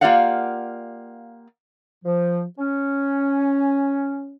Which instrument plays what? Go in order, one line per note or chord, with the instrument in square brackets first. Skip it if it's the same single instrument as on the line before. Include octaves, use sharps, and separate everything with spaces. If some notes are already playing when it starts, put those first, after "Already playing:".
[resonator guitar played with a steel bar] A#3 F4 G4 D5 F5 F#5
[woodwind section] F3
C#4